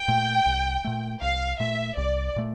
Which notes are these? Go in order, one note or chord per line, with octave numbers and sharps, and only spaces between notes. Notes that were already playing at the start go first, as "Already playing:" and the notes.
Already playing: G5
A#2 A3
C2
A#2 A3
C2 F5
A#2 A3 E5
C2 D5
A#2 A3